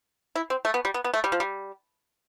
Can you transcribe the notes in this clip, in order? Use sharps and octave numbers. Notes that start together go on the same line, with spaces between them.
E4
C4
A3
B3
G3
B3
B3
A3
G3
F3
G3